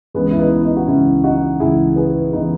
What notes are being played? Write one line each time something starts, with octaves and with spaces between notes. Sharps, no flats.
C#2 C#3 E3 G#3 B3
E4
B3 D#4
B3 D#4
F#4
C#2 C#3 E3 C#4 E4
D#4 F#4
C#2 C#3 E3 E4 G#4
G#4 B4
C#3 E3 B3 D#4